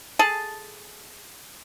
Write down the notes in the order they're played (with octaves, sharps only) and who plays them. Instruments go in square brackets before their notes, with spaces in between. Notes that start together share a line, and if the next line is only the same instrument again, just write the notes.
[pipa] G#4 A4 A5